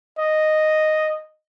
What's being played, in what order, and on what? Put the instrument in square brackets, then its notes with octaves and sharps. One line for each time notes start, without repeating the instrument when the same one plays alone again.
[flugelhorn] D#5